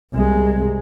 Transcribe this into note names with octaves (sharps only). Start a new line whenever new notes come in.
C2 G#3